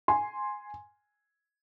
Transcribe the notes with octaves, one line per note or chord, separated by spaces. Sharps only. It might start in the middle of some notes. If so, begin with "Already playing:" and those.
G#5 C6